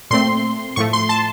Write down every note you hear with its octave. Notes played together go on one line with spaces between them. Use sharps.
A#2 A3 C4 C6
A2 F3 A3 C#6
C6
A5